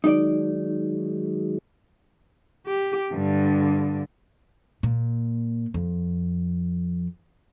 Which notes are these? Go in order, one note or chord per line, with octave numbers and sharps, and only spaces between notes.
D#3 F#3 G#3 D#4 D5
G4
G2 D3
A#2
F2